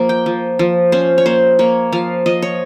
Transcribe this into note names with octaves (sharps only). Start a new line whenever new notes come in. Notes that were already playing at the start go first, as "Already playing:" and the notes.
Already playing: F3 A#3
G5
F3
F3
C#4 C5
C#5
A#3 C5
A#3 C#5
F3 F5
F3 D#5
C#5